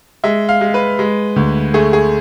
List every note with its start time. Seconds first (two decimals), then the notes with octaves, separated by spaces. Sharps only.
0.24 G#3 E5
0.49 F5
0.61 G#3
0.74 B4
0.99 G#3
1.36 D2
1.74 A3 G#4
1.93 G#4